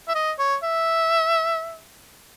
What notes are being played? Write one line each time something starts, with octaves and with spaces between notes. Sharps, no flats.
E5
D#5
C#5
E5